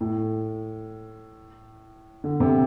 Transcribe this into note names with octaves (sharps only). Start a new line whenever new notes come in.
A2
D3
C3